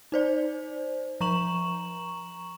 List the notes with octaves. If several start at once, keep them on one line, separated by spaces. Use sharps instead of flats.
D#4 C5 D5
F3 A#5 C#6 E7 F#7